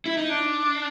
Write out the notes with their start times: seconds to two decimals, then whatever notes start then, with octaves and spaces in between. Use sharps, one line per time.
0.06 E4
0.17 D#4
0.29 D4